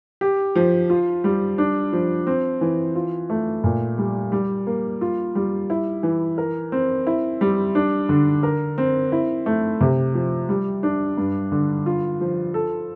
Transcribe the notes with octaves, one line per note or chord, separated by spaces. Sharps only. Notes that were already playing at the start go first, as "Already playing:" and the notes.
G4
F3
F4
G3
D4
F3
C4
E3
F4
A3
A#2
G3
G3
A#3
F4
G3
E4
E3
A#4
C4
E4
G3
D4
D3
A#4
C4
E4
A3
C3
F3
G3
D4
G2
D3
F4
F3
A4